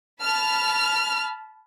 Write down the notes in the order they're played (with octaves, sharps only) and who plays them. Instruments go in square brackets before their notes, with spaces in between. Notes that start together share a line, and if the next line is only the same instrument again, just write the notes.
[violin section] A5 B5 F6